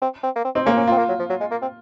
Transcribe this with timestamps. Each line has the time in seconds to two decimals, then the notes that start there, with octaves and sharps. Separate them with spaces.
0.02 C4
0.23 C4
0.36 A#3
0.45 C4
0.55 C4 D#4
0.66 A#3 C#4
0.77 C#4
0.87 C4 F4
0.98 A#3
1.09 F#3
1.19 F3
1.30 F#3
1.40 G#3
1.51 A#3
1.62 C4